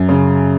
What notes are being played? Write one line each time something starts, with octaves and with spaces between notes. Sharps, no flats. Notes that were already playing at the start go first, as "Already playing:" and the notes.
Already playing: F#2
C#3